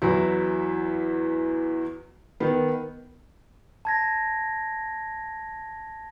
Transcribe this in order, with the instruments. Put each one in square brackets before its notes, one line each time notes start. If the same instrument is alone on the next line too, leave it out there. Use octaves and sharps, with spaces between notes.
[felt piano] E2 F#3 E4
D#3 B3
[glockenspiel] A5 G#6 A#6